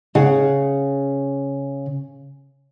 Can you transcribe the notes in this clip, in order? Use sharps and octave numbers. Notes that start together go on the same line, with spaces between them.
C#3 F#5